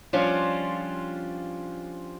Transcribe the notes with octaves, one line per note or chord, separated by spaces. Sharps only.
F3 G3 C#4 D4 F4